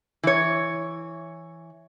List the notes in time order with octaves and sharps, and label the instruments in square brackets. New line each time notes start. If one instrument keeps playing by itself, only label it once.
[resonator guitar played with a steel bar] E3 C#5